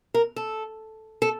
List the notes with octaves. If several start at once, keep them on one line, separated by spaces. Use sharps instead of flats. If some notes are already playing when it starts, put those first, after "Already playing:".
A#4
A4
A4